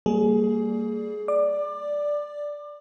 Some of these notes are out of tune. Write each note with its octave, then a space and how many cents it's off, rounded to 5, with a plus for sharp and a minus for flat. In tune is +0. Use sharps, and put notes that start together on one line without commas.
G3 +0 A#3 -25 G#4 +20
D5 +0 D6 +25